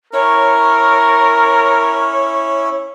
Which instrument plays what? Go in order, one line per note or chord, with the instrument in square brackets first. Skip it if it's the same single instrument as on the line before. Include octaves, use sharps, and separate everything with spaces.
[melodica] C#4 E4 [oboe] A#4 [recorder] C#5